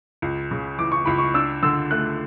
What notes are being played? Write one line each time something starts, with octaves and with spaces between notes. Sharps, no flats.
C#2
C#3
E3 D6
C#6
C#2 B5
C#6
D4 E6
D3 E6
A3 F#6